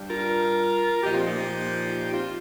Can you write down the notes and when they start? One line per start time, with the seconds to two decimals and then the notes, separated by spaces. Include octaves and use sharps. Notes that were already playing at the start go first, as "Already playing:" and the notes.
Already playing: G2 G3
0.10 F4 A#4
1.02 A#2 F3 D#4 G4
1.14 C4 F4
1.27 A#3 D#4
1.39 D#4 G4
2.13 C4 F4